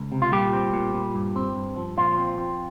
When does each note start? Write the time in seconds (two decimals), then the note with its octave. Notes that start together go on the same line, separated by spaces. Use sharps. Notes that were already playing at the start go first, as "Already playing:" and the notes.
Already playing: C#2
0.12 C3
0.22 F4
0.32 A#2 G3 G4
0.53 C4
0.73 A#2
0.94 A#2
1.15 G2
1.36 C4
1.56 G2
1.76 F3
1.97 A#2 F3 F4
2.18 C4
2.38 C4